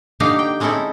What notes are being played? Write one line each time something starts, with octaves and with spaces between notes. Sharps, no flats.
D3 A#3 D#4 G4 F5 A#5
G5
G#3 C4 C#4 D#4 E4 A4